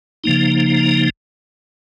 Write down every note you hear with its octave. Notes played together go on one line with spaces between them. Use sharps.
C#3 F3 A#3 D#4